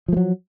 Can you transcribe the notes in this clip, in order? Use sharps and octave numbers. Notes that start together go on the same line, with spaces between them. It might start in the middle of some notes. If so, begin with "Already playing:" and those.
F3 F#3 A3